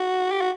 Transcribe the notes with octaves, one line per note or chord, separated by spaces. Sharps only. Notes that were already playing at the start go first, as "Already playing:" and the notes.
Already playing: F#4
G4
F#4